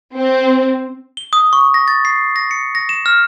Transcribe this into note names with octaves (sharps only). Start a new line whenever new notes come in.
C4
G7
D#6
C#6
A#6
A6
C7
A#6
C#7
A#6
E7
F6